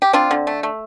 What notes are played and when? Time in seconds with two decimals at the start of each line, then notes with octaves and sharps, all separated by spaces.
0.02 G4
0.13 C4 D4 F4
0.31 D3
0.47 A3
0.63 A3